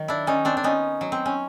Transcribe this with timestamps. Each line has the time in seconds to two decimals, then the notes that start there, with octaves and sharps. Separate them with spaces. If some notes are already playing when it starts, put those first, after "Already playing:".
Already playing: D#3 F#3
0.08 D4 E4
0.27 D#3 C#4 D#4
0.45 C4 D4
0.57 D4
0.63 B3 C#4 D#4
1.01 F#3
1.12 C4
1.26 C#4